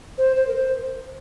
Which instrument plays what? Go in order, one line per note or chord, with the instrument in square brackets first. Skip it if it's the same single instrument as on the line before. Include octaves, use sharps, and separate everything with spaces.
[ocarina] C5
C5
A#4
C5